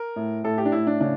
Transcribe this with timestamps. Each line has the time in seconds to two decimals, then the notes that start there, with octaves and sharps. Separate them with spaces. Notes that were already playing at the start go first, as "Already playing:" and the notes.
Already playing: A#4
0.16 A2
0.44 A2 A4
0.58 G4
0.65 D4
0.72 A2 E4
0.87 D4
1.01 C#3 D4